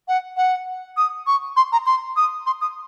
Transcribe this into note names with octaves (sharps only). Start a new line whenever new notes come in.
F#5
F#5
D#6
C#6
C6
A#5
C6
D#6
C6
D#6